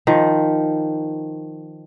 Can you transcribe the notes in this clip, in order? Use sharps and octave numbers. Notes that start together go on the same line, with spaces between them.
D#3 F3